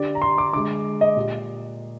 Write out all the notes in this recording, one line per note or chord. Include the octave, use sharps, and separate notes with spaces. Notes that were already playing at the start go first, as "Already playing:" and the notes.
Already playing: D3 G3 D5
A#5
C6
D6
D3 G#3 D6
D#5
A#2 G3